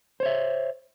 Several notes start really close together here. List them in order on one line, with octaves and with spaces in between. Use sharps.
C5 C#5 E5